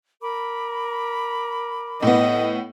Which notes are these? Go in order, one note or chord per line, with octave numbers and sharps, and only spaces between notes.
A#4 B5 D6
A2 B3 D#5